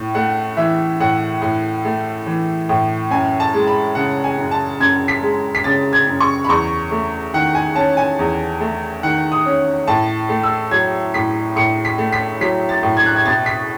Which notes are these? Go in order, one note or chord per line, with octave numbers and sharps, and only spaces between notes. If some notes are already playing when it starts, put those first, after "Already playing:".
Already playing: A2
A3 F#5
E3 E5
A2 F#5
A2
A3
E3
A2
F#2 G#5
A5
G#3
B5
C#3 F#5
G#5
F#2
A5
F#2 G#6
B6
G#3
B6
C#3 A6
G#6
F#2
C#6
B5
E2 C#6
A3
D#3 F#5
G#5
C#4 A5
G#5
E2
A3
D#3 F#5
D#6
C#4
A2 A5
A3
E6
F#3 G#6
A2 B6
A2 C#7
B6
A3
B6
F#3 B6
A6
A2
G#6
F#6
G#6
B2 A6
B6